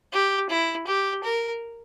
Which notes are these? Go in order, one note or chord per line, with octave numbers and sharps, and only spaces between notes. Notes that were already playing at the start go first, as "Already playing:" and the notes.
G4
E4
G4
A#4